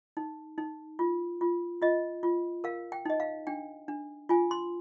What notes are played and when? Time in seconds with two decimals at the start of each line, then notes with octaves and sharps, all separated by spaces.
0.17 D#4
0.58 D#4
0.99 F4
1.41 F4
1.82 F4 D#5
2.23 F4
2.64 A#4 F5
2.92 G5
3.05 D#4 D#5
3.20 F5
3.47 D4 G5
3.88 D4
4.29 F4 G#5
4.51 C6